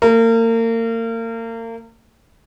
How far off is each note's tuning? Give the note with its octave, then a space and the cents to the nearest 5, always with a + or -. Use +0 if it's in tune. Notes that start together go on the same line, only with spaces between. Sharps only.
A#3 -35